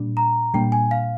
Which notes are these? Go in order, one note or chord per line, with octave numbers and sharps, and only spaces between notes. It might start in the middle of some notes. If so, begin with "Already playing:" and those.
Already playing: A#2 G3 D4
A#5
A#2 G3 A#3 D4 G5
G#5
F5